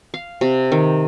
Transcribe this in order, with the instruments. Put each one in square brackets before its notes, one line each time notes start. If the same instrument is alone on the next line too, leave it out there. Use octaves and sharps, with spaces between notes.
[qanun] F5
C3
D#3